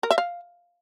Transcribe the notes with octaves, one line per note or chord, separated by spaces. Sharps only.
A#4
E5
F5